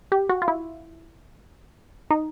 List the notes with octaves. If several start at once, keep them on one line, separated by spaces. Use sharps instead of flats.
G4
F#4
F4
E4
D#4